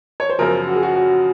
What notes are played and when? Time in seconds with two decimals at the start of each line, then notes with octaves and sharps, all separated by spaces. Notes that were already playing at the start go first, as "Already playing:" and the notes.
0.20 C#5
0.29 C5
0.39 F#2 C#3 F3 A#4
0.68 F#4
0.75 G#4
0.83 F#4
0.96 F#4